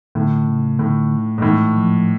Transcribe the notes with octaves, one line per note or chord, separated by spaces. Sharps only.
A2 D3
C#3
A2 D3
G#2
A2 E3
F3